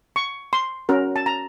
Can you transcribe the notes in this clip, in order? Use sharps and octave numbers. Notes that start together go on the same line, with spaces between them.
C#6
C6
C#4 F#4 A#4
A5
A#5